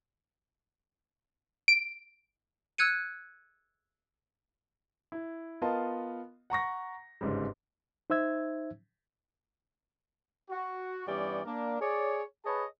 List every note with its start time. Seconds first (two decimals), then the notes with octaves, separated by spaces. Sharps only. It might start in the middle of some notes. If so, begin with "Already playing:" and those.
1.68 D7
2.78 E6 F#6 G#6 C#7 D#7
5.12 E4
5.62 B3 F4 A#4 D#5 F5 A5
6.50 F#5 A#5 C#6 A#6
7.21 G1 G#2 C#3 G3
8.10 D#4 C5 E5 E6 G#6
10.50 F#4
11.06 G2 E3 G3 B3 C#4 D5
11.45 A#3 D4 A#4
11.81 G#4 C#5 D5
12.45 G#4 B4 C#5 D#5 A5